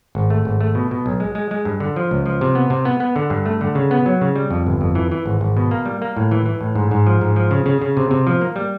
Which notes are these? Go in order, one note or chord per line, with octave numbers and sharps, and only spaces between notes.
G#1
A3
G#1
A3
B2
B2
B1
G#3
G#3
G#3
G2
D3
F3
C#2
F3
C3
B3
C3
B3
B3
D3
G2
A3
D3
C#3
B3
F#3
C#3
G3
F2
G1
F2
E3
E3
G#1
G#1
B2
A#3
G3
A#3
A2
E3
E3
A2
G#2
G#2
F3
G#2
F3
C#3
C#3
C#3
C3
C3
F3
A#3
G3